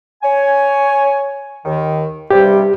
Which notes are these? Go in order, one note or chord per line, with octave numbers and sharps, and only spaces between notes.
C#5 G#5
D#2 D#3
G2 C3 G3 G4